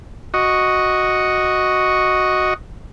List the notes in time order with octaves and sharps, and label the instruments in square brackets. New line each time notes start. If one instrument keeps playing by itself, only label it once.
[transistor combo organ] F#4 D#5 C#6